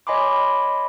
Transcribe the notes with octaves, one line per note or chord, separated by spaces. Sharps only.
C#5 D#5 G#5 B5 C6 D6